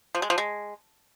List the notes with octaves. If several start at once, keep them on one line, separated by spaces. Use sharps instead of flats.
F3
G#3
F3
G#3